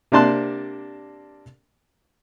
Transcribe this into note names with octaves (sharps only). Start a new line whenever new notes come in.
C3 A#3 D4 A5 C6 F#6